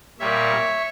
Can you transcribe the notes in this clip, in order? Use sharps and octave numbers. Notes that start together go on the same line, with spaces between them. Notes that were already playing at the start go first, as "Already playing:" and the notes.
A#2 G3 A#3 C#5 E5